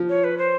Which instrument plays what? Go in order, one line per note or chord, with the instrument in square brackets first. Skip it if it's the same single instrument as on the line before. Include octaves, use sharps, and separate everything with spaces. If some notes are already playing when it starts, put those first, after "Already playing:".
Already playing: [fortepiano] F3
[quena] C#5
B4
C5